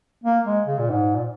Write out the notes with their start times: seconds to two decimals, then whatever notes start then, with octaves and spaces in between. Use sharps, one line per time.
0.24 A#3
0.45 G#3
0.67 C#3
0.79 A#2
0.90 G#2
1.15 A#2